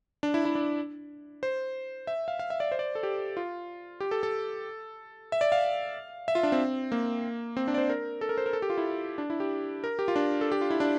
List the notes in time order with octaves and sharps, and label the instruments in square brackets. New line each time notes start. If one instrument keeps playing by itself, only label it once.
[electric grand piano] D4
E4
E4
D4
C5
E5
F5
F5
E5
D5
C5
D5
A4
G4
F4
G4
A4
A4
E5
D5
F5
E5
F4
D4
C4
A#3
C4
D4
D5
C5
A#4
A4
A#4
C5
A#4
A4
G4
F4
E4
D4
E4
G4
A#4
G4
F4
D4
A4
G4
F4
E4
D4